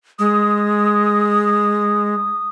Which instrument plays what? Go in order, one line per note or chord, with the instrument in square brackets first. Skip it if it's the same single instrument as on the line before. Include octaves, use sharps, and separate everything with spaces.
[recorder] G#3 [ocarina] D#6